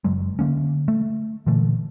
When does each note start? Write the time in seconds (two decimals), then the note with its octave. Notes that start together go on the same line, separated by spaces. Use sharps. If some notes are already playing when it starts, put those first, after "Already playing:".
0.04 F#1 F#3 G#3
0.39 D3 F3 A#3 C#4
0.88 A3
1.46 A#2 D3 E3 A3